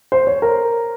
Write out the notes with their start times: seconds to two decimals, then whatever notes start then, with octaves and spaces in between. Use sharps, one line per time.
0.12 C5
0.27 C#5
0.42 A#4